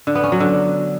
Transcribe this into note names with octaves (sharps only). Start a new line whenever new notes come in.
D3
B3
C#4
F#3
D3